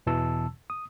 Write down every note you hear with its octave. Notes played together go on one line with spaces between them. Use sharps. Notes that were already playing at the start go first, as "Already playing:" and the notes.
E2 B2 E3 A5 E6
D#6